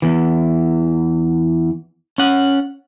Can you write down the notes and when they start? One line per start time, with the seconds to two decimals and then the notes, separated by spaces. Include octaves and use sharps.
0.02 E2 E3
2.18 C#4 F#5